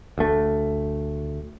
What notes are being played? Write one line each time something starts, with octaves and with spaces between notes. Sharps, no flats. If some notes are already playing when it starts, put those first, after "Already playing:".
D2 A3